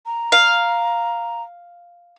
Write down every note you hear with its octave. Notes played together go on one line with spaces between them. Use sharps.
A#5
F5